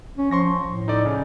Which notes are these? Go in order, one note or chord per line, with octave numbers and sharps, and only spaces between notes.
C#4
F3 C6 C#6 A#6
A2
D#4 A4 D5
C#3